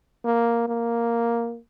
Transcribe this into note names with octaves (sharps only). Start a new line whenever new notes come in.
A#3
A#3